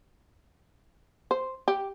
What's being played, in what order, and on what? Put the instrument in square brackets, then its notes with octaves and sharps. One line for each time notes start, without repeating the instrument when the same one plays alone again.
[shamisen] C5
G4